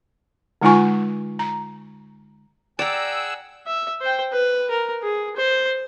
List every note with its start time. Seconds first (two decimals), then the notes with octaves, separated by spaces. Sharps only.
0.62 D3 G#3 D#4 F4 G#5 C#6
1.39 A#5
2.79 G#4 D5 F#5 G5 A#5 E6
3.67 E5
4.01 C5 G5
4.32 B4
4.70 A#4
5.03 G#4
5.37 C5